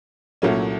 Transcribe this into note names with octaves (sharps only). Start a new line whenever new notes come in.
C2 A#2 F#3 A3 C#4